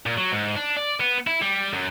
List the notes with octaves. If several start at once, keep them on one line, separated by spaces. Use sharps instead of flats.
A#2
F#3
G#2
D4
D5
B3
E4
G3
F#2